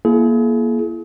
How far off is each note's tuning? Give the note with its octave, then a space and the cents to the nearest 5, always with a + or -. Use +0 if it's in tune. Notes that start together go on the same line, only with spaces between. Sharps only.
A#3 +20 E4 +30 G#4 +35